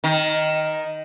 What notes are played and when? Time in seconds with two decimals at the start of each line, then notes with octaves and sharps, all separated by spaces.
0.04 D#3